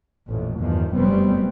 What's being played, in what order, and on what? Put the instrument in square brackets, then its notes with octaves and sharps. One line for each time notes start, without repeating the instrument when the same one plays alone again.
[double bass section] A1 F2 A#2
E2 G2 D#3 F3
F1 F#2 G3 B3 C4